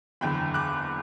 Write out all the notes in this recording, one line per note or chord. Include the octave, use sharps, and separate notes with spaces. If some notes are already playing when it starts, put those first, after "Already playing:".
F#1 E2 D3 G5 B5
D6 F#6